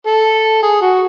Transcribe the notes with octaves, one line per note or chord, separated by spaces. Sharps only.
A4
G#4
F#4